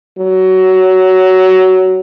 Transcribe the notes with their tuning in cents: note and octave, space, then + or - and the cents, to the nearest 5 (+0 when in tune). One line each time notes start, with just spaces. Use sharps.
F#3 +15